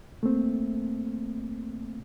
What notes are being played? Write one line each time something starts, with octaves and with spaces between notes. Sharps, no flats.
A3 A#3 C4